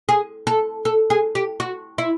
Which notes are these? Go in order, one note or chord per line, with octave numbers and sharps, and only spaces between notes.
G#4
A4
A4
G#4
G4
F#4
E4